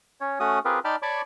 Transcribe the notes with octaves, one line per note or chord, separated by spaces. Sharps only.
C#4 C#5
A3 C#4 F#4 D#6
C4 F4 G4 G#4 A#4 B4
D#4 D5 G5 A5 B5 F6
C#5 D5 A5 B5 C#6 D6